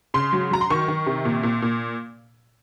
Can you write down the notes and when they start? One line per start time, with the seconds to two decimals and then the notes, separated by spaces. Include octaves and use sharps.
0.14 C#3 C6
0.33 F#3
0.51 F#3 A#5
0.61 C6
0.70 D#3 C#6
0.88 D#3
1.06 C3
1.25 A#2
1.43 A#2
1.62 A#2